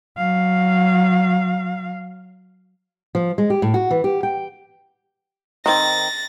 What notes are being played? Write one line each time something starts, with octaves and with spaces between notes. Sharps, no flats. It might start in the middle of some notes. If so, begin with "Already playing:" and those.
F#3 F5
F3
G#3
G4
A2
F#4
E3
G4
G5
D#3 C4 A6 A#6